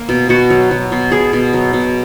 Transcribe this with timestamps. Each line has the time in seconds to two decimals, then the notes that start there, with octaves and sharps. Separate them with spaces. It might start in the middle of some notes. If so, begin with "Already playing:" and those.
Already playing: A#3
0.09 B2
0.29 B2 F#4
0.50 F#3
0.71 F#3
0.92 B2
1.12 B2 G#4
1.33 B2
1.53 F#3
1.73 B2